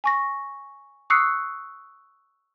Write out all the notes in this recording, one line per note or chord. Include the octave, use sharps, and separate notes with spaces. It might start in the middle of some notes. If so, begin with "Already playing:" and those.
G#5 C#6 A#6
C#6 D#6 E6 F#6 C7 C#7